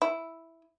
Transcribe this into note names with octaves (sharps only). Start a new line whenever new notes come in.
E4